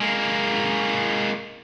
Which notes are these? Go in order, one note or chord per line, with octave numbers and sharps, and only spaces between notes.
G#3 A#3